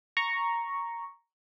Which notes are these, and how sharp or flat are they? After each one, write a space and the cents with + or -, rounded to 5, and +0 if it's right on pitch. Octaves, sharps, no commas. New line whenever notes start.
A#5 +0 C#6 +0